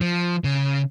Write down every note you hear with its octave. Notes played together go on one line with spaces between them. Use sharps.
F3
C#3